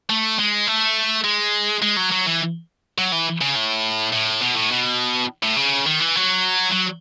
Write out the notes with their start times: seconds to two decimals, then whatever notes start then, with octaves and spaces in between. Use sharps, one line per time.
0.09 A3
0.39 G#3
0.67 A3
1.24 G#3
1.82 G#3
1.96 F#3
2.11 F#3
2.26 E3
2.98 F#3
3.12 E3
3.41 C#3
3.55 A2
4.13 A2
4.42 B2
4.56 A2
4.71 B2
5.43 A2
5.57 C#3
5.87 D#3
6.00 E3
6.15 F#3
6.72 F#3